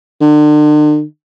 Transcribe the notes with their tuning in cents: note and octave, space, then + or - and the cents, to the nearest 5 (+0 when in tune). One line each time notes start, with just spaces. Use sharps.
D3 +40